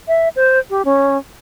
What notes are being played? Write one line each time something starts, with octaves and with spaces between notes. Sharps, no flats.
E5
C5
G4
C#4